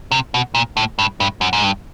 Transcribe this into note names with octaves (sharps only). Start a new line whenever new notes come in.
C3
B2
A#2
A2
G2
G2
F#2
G#2
G2